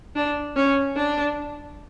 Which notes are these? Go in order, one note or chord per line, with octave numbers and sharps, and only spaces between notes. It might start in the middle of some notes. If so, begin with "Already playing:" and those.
D4
C#4
D4